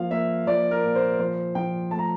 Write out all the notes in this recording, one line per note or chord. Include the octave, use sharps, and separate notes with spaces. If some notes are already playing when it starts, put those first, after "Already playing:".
Already playing: F3 A#3 F5
A#3 E5
F3 D5
A#4
A#2
C5
F3 C5
F3 G5
A3 A5
A#5